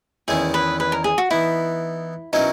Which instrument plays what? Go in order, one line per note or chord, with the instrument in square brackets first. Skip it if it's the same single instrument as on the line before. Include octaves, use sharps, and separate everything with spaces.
[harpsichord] E2 D#3 G#3 C#4 E4 [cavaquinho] G#4
[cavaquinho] B4
B4
A#4
G#4
F#4
[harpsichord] E3 B3 D#4 [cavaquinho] E4
[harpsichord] B2 F#3 C#4 E4 A#4 [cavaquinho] D#4